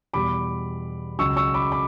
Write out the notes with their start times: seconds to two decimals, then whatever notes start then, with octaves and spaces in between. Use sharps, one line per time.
0.14 E2 B2 G3 B5 D6
1.19 C#2 C#3 F#3 C#6 E6
1.36 C#6 E6
1.54 B5 D6
1.72 B5 D6